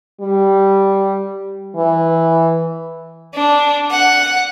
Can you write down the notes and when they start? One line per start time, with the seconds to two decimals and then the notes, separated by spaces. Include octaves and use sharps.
0.21 G3
1.76 E3
3.34 D4
3.91 F#5